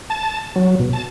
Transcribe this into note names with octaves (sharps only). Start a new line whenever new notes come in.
A5
F#3
B2
A5